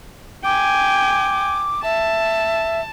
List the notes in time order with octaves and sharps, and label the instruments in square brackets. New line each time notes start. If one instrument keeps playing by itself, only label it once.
[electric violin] G5 G#5 [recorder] D6
[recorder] E5 [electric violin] A5